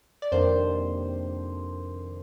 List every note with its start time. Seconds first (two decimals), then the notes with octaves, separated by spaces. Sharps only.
0.22 D5
0.32 F2 C3 D#3 A#3 D4 C5